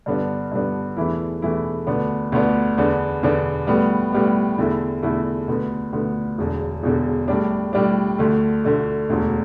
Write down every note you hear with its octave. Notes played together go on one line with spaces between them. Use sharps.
G2 D3 B3 D4
G2 D3 B3 D4
E2 E3 A3 E4
E2 E3 A3 E4
D2 D3 B3 D4
D2 D3 B3 D4
E2 D3 B3 D4
E2 D3 B3 D4
A2 G3 B3
A2 G3 B3
E2 D3 A3 E4
E2 D3 A3 E4
D2 D3 B3
D2 D3 B3
E1 E2 D3
E1 E2 D3
A2 G3 D4
A2 G3 D4
D2 D3 A3
D2 D3 A3
E1 D2 D3